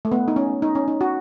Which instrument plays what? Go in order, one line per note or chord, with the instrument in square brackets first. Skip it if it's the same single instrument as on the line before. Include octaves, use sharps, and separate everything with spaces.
[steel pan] A3
B3
D#4
C#4
D#4
C#4
D#4
F#4